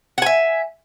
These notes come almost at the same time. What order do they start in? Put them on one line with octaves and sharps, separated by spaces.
F#5 G#5 E5